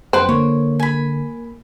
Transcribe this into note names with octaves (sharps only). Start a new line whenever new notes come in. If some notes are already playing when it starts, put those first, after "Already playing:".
F#2 G3 B3 B4 C5 F#5 G5
D3 A#3 C#5
G#5 B5